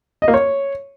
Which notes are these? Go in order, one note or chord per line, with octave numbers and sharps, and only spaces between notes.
D#5
A#3
C#5